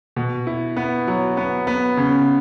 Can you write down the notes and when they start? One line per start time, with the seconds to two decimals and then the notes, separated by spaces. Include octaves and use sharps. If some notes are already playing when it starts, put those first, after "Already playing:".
0.16 B2
0.47 E4
0.77 B3
1.07 F#3
1.37 B3
1.67 B3
1.97 C#3